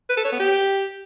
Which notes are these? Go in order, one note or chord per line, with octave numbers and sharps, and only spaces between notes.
B4
A4
C#5
B3
G4